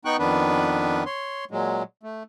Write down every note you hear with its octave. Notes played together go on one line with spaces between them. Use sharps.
B3 D#4 G5 C#6 F#6
F2 D#3 B3 D4 B4
C#5 C6
A#2 F#3 G#3
A3